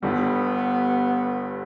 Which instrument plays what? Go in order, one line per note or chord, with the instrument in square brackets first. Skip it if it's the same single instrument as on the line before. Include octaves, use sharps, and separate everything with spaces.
[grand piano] G1 G2 D3 G3 [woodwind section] B3